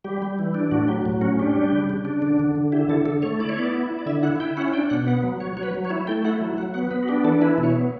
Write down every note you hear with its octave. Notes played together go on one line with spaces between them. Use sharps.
G3 G4
G3
E3
D4
A2 F#4
F#3 G4
A2
C#4 F#4
D4 G4
G3
C#3
C#3
D4
D3
D3
D3
E4 G4
D3 A4
D3 A4
A3 C#5
E4 D5
C#5
B3 D5
E4
E4
D5
D3 E5
E4 F#5
E4 G5
C#4 F#5
D4 G5
B2 F#5
B3 F#5
F#3
F#3 C#5
F#3 C#5
B4
F#3
C#5
E4
A3 G5
E4 F#5
F#3
F#3 F#5
B3 F#5
B3 B4
F#4
D4 G4
E3 A4
E4 B4
B2
C#5
B3